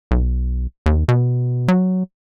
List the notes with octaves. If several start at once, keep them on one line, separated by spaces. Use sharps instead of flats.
B1
D#2
B2
F#3